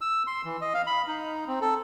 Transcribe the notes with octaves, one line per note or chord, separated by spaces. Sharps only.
E6
C6
E3
D#5
F5
B5
D#4
C4
A4